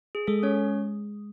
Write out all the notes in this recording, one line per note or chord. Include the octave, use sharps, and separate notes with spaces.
G#4
G#3 A4
C#4 C#5